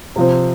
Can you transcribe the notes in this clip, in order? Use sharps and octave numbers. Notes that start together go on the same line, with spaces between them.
C3 F3 C4